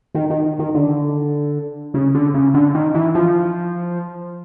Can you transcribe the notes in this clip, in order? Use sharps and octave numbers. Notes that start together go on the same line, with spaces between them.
D#3
D#3
D#3
D3
C#3
D3
C#3
D3
D#3
E3
F3